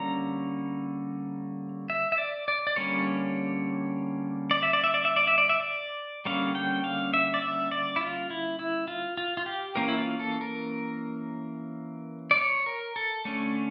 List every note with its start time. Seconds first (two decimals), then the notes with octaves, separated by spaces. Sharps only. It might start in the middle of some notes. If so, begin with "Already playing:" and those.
Already playing: D3 G3 A#3 C#4 A#5
1.90 E5
2.12 E5
2.18 D5
2.48 D5
2.67 D5
2.76 D3 G3 A#3 C#4 C#5
4.51 D5
4.63 E5
4.73 D5
4.84 E5
4.94 D5
5.05 E5
5.16 D5
5.27 E5
5.38 D5
5.49 E5
5.60 D5
6.25 D3 G3 A#3 C#4 F5
6.55 G5
6.84 F5
7.14 E5
7.34 D5
7.42 E5
7.71 D5
7.96 E4
8.01 F4
8.30 E4
8.59 E4
8.88 F4
9.17 F4
9.37 F4
9.46 G4
9.75 E3 A#3 C#4 A#4
9.88 E4
9.98 F4
10.19 A4
10.41 A#4
12.31 D5
12.38 C#5
12.66 A#4
12.96 A4
13.25 D3 A3 C#4